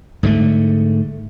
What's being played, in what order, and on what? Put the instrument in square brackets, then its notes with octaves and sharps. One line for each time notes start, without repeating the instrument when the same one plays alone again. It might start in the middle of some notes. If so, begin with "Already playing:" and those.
[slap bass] G#2 D3 A3